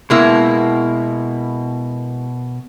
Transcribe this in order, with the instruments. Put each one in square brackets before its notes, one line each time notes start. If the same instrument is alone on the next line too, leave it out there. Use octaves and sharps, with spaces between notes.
[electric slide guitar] B2 [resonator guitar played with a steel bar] G#3 A#3 E4